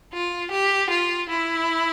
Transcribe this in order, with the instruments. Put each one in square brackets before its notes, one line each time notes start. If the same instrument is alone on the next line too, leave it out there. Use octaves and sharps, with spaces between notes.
[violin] F4
G4
F4
E4